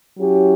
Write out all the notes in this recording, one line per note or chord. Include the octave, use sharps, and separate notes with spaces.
F#3 C#4 E4 G4